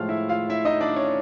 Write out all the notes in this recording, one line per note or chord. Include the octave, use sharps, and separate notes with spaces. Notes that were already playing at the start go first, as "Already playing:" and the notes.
Already playing: A2 F3 G#3 F4 F5
E4 E5
F4 F5
E4 E5
D#4 D#5
D4 D5
C#4 C#5